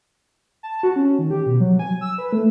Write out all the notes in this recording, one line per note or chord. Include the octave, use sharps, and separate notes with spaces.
A5
F#4
C#4
D#3
G4
B2
F#3
G#5
E6
B4
A3